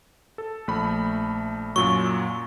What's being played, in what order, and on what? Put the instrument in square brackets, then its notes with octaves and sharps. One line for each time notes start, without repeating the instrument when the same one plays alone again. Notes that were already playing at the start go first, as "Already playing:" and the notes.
[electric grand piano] A4
A#1 A3 B5
[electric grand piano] F#2 A#2 F#3 [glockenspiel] C#6